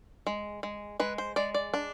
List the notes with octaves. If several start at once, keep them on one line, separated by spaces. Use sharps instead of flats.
G#3
G#3
G#3 B4
C5
G#3 D5
D5
D4